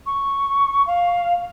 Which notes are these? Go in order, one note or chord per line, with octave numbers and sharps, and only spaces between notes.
C#6
F5